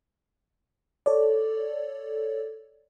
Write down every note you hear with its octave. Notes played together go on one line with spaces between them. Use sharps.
A4 C#5 D5